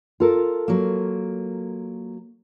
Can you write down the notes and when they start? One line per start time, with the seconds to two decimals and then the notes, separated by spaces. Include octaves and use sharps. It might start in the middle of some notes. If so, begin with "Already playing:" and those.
0.20 F4 A4 A#4
0.68 F#3 A#3